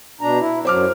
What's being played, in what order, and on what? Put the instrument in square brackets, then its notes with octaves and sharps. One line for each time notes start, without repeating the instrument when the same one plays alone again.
[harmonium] B2 D4 A#5
E4
[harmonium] F#2 F#3 [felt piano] C5 D6 F6